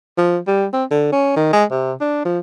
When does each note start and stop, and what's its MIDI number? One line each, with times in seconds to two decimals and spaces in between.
0.18 0.38 53
0.47 0.66 55
0.73 0.84 60
0.91 1.08 50
1.12 1.33 61
1.37 1.49 51
1.53 1.65 56
1.71 1.93 48
2.01 2.24 62
2.25 2.39 53